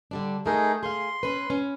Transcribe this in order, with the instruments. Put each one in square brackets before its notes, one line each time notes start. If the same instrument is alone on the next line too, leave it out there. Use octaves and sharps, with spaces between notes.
[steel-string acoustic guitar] D3 G3 D4
[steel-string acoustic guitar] A3 A#4 [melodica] D#4 G#4
[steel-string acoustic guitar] G#4 F5 [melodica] C6
[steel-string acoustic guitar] C#4 B4
C#4